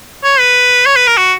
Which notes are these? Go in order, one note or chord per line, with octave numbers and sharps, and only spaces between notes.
C#5
B4
C#5
B4
A#4
F#4